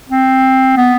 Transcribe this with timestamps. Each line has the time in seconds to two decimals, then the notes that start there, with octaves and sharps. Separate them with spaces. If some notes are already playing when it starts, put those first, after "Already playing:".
0.09 C4
0.77 B3